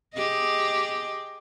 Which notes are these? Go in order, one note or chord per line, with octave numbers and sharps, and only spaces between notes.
G4 G#4 D#5